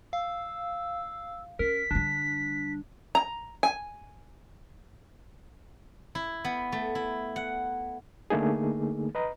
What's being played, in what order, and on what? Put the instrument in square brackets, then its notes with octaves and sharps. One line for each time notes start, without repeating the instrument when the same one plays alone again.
[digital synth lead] F5 [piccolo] E6
[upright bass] C#4 [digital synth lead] A#4 [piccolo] B6
[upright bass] D3 G3 [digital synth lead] D4
[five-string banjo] A#5
G#5
[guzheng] E4
B3
A3
E4
F#5
[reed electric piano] D3 A3 A#3 D#4 G#4
B4 D#5 A#5